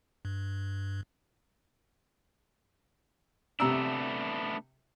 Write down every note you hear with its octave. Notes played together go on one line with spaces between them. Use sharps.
G2
C3 A3 B3 D4 A#5 E6